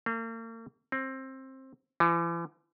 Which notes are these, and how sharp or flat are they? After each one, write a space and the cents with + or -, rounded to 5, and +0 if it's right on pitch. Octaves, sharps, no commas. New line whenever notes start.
A#3 -40
C4 +20
E3 +40